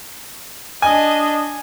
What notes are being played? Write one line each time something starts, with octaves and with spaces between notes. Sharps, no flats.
D4 D#5 G#5